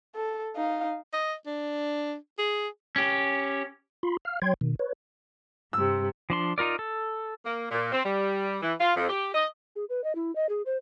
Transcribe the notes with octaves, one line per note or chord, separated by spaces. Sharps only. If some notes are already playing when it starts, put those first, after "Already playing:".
A4
D#4 F5
D#5
D4
G#4
C#4 G4
F4 B5 C6
F5 F6
F#3 C#5 G5 C6 G#6
B2 D#3
B4 C#5
G2 C3 E6
F3 D4 C6
D#4 F4 A#4 D5
A4
A#3
A#2
C4
G3
E3
F4
F2
G4
D#5
G#4
B4
D#5
E4
D#5
G#4
C5